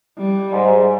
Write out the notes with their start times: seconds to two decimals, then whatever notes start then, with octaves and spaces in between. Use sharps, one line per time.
0.18 G3
0.53 G#2